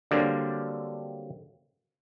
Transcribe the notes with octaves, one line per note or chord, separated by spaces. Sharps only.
D3 F#3 G3 A#3 C4 D4